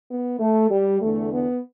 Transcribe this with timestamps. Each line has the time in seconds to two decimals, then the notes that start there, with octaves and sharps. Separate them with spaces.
0.09 B3
0.39 A3
0.69 G3
1.01 E2 D3 A3
1.32 B3